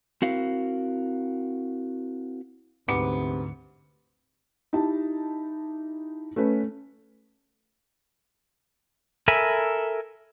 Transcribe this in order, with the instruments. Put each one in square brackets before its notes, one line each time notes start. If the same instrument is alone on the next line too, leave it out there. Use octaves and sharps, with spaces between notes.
[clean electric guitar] C4 E4 F#4 A#4 F5
[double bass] D2 [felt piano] G#2 D6 C#7 [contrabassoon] C3 [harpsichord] B3
[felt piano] D#4 E4 G4 A5
A3 C#4 B4
[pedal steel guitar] A4 A#4 E5 G#5 B5